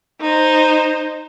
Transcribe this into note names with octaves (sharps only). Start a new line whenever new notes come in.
D#4 C5